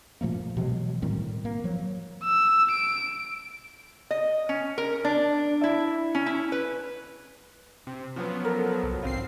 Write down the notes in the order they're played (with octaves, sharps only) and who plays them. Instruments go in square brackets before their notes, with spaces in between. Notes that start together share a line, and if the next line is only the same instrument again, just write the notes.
[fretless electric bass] A#2 F3 A3 A#3
B2 E3 F#3 G#3
A2 D#3 G3 C4
A#3
F3 F#3
[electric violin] E6
D7
[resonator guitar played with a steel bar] D#5
C#4
A#4
D4
E4
C#4
E4
B4
[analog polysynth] C3
[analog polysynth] F3 F#3 B3 [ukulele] C#4
[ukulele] A4 A#4
[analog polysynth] C2
[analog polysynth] G#1 C4 C7 [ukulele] F4